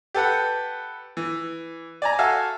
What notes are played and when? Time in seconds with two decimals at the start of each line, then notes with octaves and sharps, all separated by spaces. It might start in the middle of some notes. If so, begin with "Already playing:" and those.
0.14 G4 A4 B4 F#5
1.17 E3
2.02 D5 G#5 A#5
2.18 F#4 A4 E5 F5 G#5